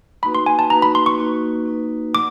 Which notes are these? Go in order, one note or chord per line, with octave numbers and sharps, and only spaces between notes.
A#3 D#4 F#4 B4 B5
C6
G#5
A5
A#3 D#4 F#4 B4 A#5
B5
C6
C#6
A#3 D#4 F#4 B4
A#3 D#4 F#4 B4
D5 F#5 D6